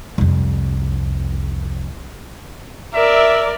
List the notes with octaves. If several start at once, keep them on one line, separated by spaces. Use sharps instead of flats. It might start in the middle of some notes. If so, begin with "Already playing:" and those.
C2 F2
A#4 D5 E5